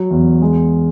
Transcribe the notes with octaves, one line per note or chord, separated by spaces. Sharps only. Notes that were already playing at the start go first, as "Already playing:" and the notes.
Already playing: F#3
E2
G#3